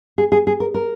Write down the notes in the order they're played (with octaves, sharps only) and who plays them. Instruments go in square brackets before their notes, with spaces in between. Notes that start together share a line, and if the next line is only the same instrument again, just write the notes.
[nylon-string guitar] G#4
G#4
G#4
A#4
A#4